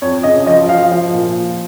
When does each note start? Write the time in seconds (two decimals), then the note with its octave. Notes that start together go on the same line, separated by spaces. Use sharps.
0.02 F2 C#5
0.23 C#3 D#5
0.47 F3 D#5
0.68 F3 F5
0.91 F3
1.14 A#2